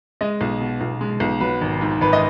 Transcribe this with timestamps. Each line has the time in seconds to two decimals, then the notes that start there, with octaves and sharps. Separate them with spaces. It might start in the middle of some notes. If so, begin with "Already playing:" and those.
0.21 G#3 D#5
0.41 B1
0.60 B2
0.81 B1
1.01 G#3
1.20 B1
1.40 F#3 B4
1.61 G#1
1.81 G#2
2.01 G#1 B4
2.13 D#5